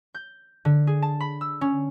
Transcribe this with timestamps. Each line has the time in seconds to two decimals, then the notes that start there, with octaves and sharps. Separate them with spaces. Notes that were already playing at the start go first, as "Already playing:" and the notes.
0.14 G6
0.65 D3
0.87 G#4
1.02 A5
1.20 B5
1.41 E6
1.61 C#4